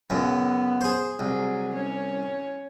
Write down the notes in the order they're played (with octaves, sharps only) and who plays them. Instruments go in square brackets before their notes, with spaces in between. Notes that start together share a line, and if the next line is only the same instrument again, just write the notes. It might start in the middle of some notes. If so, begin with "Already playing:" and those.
[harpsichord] C#2 F#2 [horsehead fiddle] B3
[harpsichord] G#4 C5
[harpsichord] C2 [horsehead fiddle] F#3 G#4
[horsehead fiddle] C#4 C#5